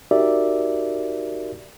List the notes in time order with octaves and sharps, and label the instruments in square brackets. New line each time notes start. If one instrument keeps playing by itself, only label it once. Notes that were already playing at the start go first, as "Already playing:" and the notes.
[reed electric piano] D#4 F#4 G4 A#4 D5 E5